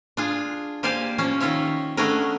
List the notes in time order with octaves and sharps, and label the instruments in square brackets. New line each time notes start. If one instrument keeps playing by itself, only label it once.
[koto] D4 F4 G#4
A#3 G4 C5 D5 F5 G#5
F3 A#3 C#4
D#3 C#4 F4 C#5 E5
A3 B3 C#4 D4 G#4 A#4